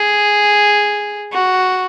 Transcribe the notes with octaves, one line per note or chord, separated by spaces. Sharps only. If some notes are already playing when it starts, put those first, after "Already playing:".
Already playing: G#4
F#4